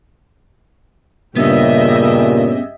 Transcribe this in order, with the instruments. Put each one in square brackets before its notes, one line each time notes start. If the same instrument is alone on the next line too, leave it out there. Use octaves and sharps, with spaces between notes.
[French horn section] G2 C#3 [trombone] A#2 [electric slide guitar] B3 C#4 [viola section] G4 D#5 E5